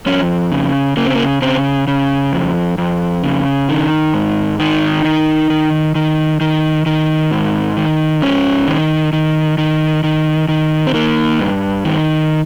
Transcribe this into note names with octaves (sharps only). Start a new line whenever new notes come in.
F2 C#4
C#3
C#3 A#3
C4
A#3
C#3 C4
C#3
F2
F2
C#3
D#3
G#2
D#3 D#4
D#3
D#3
D#3
D#3
D#3
G#2
D#3
G#2 C#4
D#3
D#3
D#3
D#3
D#3
C4
D#3 A#3
G2
D#3